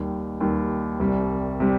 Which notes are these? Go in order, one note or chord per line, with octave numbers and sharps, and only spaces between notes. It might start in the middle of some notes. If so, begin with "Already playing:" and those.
Already playing: D#2 D#3 G3
D#2 D#3 G3
C2 C3 G3
C3 G3